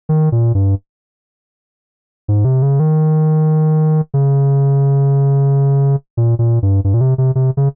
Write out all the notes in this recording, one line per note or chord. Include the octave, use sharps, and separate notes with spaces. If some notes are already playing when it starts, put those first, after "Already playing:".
D#3
A#2
G2
G#2
C3
C#3
D#3
C#3
A#2
A#2
G2
G2
A#2
C3
C3
C3
C#3